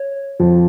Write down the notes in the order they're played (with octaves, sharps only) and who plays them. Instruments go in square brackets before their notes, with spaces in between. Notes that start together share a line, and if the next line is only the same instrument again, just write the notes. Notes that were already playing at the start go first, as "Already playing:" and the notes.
Already playing: [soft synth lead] C#5
[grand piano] F2 F3